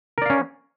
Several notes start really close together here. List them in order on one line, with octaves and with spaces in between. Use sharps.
A#4 D5 F5 C#4